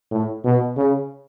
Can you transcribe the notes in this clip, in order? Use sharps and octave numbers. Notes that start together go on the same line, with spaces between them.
A2
B2
C#3